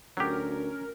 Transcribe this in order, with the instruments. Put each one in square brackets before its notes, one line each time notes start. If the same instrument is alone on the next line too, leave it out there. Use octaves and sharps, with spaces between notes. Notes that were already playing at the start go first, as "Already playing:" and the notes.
[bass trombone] D2 [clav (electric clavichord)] F#3 G4 [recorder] C#4 [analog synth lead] A#4